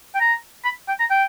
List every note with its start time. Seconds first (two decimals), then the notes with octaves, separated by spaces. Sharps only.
0.15 G5
0.20 A#5
0.65 B5
0.88 G5
1.00 A#5
1.10 G5